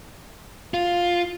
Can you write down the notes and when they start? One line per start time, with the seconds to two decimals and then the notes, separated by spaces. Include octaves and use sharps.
0.74 F4